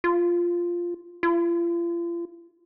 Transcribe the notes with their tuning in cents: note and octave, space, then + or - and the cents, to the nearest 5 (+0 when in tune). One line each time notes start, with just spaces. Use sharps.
F4 -5
F4 -40